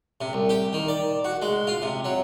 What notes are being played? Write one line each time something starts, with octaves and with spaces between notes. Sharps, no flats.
C3
C2
G4
D#3
D5
F#4
G#3
F4
C3
F#3